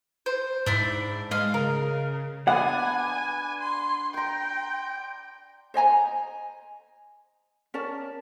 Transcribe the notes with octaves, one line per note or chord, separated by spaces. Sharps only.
C5
G#2 D4 E4 C6
G#3 D#5 F5
C#3 A#4
B3 D4 F#5 G#5
C6
G5 A#5 C6
C5 D#5 G#5 A#5
C#4 A#4 D5 A5